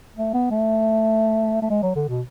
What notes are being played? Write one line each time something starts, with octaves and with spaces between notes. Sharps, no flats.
A3
B3
A3
A3
G#3
F#3
D3
B2